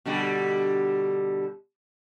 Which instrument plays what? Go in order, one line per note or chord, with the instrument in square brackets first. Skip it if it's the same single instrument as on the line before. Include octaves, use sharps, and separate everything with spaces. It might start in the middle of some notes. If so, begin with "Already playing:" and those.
[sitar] B2 D3 G3